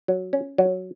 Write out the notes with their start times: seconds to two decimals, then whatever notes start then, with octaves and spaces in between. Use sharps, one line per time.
0.08 F#3
0.33 C#4
0.58 F#3